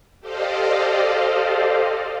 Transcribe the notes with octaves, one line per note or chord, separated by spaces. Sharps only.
G4 A4 C5 D5 D#5 F5